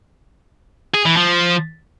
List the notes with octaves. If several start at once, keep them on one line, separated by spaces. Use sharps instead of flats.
G#4
E3
F3